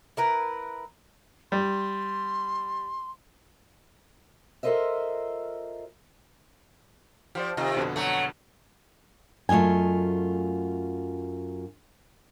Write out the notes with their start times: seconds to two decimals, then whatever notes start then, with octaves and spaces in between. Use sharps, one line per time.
0.17 E4 A#4 B4
1.52 G3 C6
4.63 F4 A4 A#4 C5 D#5 E5
7.35 F3 G4 C5 D5
7.57 C3 D#3 F4 D#5
7.77 F2 B2 D3
7.96 F#3 A3
9.49 F#2 A3 F4 D#5 G#5